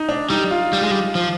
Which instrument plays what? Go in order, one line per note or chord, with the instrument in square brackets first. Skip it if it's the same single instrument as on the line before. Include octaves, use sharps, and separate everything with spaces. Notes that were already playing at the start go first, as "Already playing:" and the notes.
Already playing: [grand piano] D#4
D4
[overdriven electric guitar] G3 [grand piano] D#4
[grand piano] F4
[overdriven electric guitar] G3
G#3
G3
F3